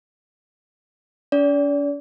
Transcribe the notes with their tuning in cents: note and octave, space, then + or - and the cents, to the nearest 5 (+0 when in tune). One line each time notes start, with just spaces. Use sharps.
C#4 +45 D5 -35